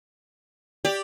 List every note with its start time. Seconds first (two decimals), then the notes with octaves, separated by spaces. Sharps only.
0.85 G4 D5